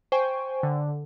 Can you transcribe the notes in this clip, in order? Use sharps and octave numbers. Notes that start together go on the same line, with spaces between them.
C5 G5 G#5 C#6
D3